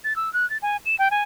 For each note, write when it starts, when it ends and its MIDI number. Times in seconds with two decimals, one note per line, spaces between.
0.04 0.16 93
0.16 0.32 88
0.33 0.48 90
0.50 0.58 93
0.62 0.77 80
0.86 0.96 100
0.99 1.09 79
1.11 1.23 80